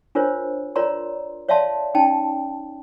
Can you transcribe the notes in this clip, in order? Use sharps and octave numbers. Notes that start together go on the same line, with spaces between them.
D4 F4 A#4 C5 C#5
F4 A#4 C#5 D5 A#5 C6
C#5 D5 E5 F5 A5 C6
C#4 D#4 G5 A5